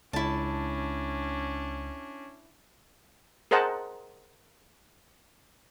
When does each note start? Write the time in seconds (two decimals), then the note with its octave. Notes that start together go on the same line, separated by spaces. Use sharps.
0.13 C#2 C#4 D4 E4 A5
3.51 G#4 A#4 C5 D#5 F#5 A5